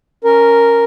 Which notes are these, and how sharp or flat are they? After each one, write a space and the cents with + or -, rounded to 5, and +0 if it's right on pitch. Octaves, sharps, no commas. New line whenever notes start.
C#4 +0 A#4 +0